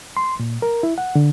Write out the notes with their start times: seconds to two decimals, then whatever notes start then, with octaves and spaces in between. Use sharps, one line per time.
0.17 C6
0.39 A#2
0.62 A#4
0.83 E4
0.98 F#5
1.15 D3